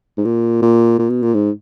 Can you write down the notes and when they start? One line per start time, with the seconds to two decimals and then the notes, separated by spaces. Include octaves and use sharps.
0.18 G#2
0.25 A#2
0.62 A#2
0.99 A#2
1.10 B2
1.22 A#2
1.34 G#2